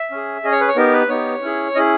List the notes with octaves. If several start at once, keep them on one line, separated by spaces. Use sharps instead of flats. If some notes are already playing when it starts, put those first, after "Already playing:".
Already playing: E5
C#4 G#4
C#4 G#4 D#5
C#5
B4
C#5
B3 D#4 G4 A#4
B4
B3 D#4 G4 C#5
C#4 E4 G#4
C#4 E4 G#4 D#5